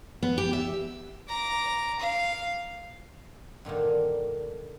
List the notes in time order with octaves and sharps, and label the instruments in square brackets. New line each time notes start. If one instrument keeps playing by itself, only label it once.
[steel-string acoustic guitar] B3
G4
E5
[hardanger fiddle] A#5 D6
F5
[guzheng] G2 A#2 D3 D#3